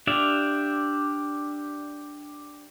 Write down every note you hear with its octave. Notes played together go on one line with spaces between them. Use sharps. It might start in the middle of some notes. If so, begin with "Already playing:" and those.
D4 G4 D5 E5 F5